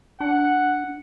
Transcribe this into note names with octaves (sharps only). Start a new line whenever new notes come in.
D4 F#5